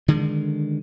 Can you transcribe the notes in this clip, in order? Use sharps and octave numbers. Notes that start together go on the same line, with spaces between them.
D3 D#3 G#3